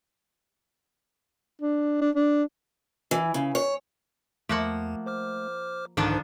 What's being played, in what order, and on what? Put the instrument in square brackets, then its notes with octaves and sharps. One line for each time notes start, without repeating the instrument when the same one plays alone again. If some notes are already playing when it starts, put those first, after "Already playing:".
[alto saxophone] D4
D4
D4
[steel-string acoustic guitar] E3
C#3
C#5
[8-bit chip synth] E2 [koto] F3 A#3 F#5 [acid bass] A3
[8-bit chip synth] C5 D6 F6
[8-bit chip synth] C2 [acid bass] G#2 [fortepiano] D3 D#3 [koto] F3 D4 A5